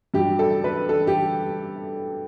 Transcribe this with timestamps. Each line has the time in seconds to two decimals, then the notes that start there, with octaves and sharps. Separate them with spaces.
0.14 G2 F#3 G4
0.39 A4
0.64 B4
0.89 A4
1.07 G4